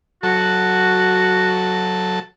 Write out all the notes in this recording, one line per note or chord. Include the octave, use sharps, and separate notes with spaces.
F#3 F#4 A4 A5